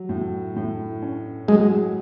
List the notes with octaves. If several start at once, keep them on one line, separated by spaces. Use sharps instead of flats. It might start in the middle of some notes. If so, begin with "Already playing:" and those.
Already playing: F#3
A2
A2
C#4
F#3 G#3